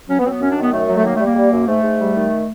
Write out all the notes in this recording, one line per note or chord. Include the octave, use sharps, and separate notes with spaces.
F#3 C#4
B3
F#3 C4
B3
F#2 C#4
D4
D#3 B3
F#2 A3
F#3
A3
D#3 A#3
A3
G3
A#3
G3
F#2
G#2 A3
G#2
G3
D#3